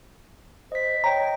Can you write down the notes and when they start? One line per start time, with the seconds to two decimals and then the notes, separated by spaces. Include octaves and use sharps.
0.72 C5 D#5 B6
1.04 C#5 D#5 G5 A#5